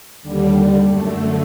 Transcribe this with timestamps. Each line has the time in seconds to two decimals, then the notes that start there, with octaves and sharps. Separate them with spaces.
0.23 D#2 D3 G3
0.88 F#2 D3 A3